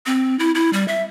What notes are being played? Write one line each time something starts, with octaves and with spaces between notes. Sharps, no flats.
C4
E4
E4
G3
E5